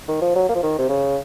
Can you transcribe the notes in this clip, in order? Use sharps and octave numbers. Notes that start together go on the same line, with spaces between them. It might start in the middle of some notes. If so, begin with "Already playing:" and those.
D#3
F3
F#3
A#3
F3
D#3
C3
C#3